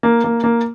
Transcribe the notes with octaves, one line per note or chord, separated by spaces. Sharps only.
A#3
A#3
A#3